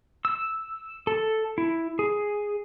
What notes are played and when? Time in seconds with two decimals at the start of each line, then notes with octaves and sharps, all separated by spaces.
0.25 E6
1.07 A4
1.58 E4
1.99 G#4